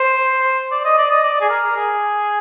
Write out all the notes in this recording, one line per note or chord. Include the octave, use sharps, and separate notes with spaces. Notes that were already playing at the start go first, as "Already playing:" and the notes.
Already playing: C5
D5
D#5
D5
D#5
D5
G#4
A#4
G#4